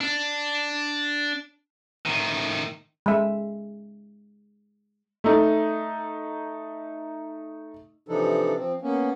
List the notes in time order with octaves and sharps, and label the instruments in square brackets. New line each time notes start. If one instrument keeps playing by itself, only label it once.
[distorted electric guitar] D4
A2 D#3
[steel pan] G#3 E5
[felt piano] A3 D#4
[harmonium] C3 E3 F3 D4 D#4 A4
F3 C4
A#3 B3 C#4